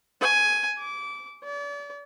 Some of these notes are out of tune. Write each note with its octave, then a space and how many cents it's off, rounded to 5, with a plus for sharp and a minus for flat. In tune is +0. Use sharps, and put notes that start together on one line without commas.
G#5 +5
D6 -25
D5 -35